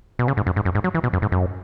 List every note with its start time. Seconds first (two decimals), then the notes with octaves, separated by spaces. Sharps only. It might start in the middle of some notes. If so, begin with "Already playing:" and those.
0.19 B2
0.28 C#3
0.37 G#2
0.47 F#2
0.56 G#2
0.65 F#2
0.75 G#2
0.84 F#3
0.95 E3
1.04 B2
1.13 F#2
1.22 G#2
1.32 F#2